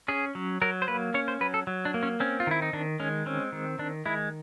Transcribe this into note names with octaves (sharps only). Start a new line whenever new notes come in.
C#4 G#4
F#3
F#3 A#4
C5
A#3 B4
C#4 C#5
C5
F#3 B4
A4
F#3
D4
A#3
C#4
C4 C#4
F4
D#3 E4
D#4
D#3 D4
G#3 C#4
C4 C#4
D#3
D#3 D4
G#3 E4